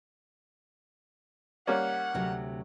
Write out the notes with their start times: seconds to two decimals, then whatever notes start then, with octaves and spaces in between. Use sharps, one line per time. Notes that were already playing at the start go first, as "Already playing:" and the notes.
1.67 G3 A#3 C#4 F#5
2.14 D2 C3 F#3